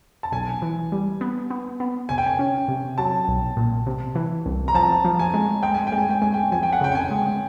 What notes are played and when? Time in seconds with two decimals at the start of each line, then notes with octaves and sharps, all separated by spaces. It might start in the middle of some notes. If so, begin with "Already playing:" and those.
0.23 A5
0.32 B1 G#5
0.62 E3
0.92 G3
1.21 B3
1.50 B3
1.80 B3
2.09 C3 G#5
2.18 G5
2.27 G#5
2.39 C#4
2.68 C3
2.98 F#3 A5
3.28 B1
3.57 A#2
3.87 C3
4.15 E3
4.46 C2
4.68 A#5
4.74 F3 A5
5.04 F3
5.19 G#5
5.34 G#3
5.63 G#3 G5
5.74 G#5
5.87 G5
5.92 G#3
5.98 G#5
6.10 G5
6.22 G#3 G#5
6.34 G5
6.52 F3 G#5
6.63 G5
6.73 F#5
6.81 C#3 G5
6.92 G5
6.95 G#5
7.11 G#3